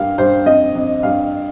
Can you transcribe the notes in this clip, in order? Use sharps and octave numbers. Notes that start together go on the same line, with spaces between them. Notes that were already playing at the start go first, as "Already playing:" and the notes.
Already playing: G2 A#3 F5
G2 C5
F2 D#5
F2
G2 F5